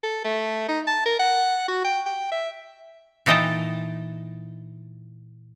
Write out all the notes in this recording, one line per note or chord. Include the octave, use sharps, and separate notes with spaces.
A4
A3
D#4
A5
A#4
F#5
F#4
G5
G5
E5
A#2 E3 D#4 D#5 G5 A5